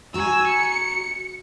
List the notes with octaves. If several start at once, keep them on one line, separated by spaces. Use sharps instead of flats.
F#4 G#5 A#5 E6
C#7